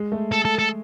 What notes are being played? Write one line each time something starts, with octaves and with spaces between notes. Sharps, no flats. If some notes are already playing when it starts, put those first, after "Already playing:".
Already playing: G#3
A3
A4
A4
A4